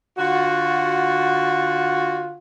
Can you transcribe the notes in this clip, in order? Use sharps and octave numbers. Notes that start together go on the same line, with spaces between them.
D3 F4 F#4